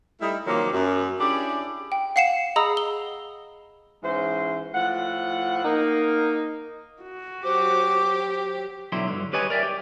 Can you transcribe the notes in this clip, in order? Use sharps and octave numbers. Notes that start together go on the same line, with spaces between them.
G3 A3 D#4 E4
C3 D#3 F3 F#3 A#3
F#2
C#4 D4 E4 G4 G#4 D5
G5
F5 F#5 C7 C#7 E7
G#4 D#5 A#5 B5 D#6 E6
G7
G#2 E3 C#4 E4 C5
A2 F3 F#5
A#3 D#4
F#4
F#3 G4 C5 D6
B1 D3 F#3 E4 G4 C6
G2 D3
G4 B4 C#5 D#5 G#5
A#4 D5 E5 G5
G4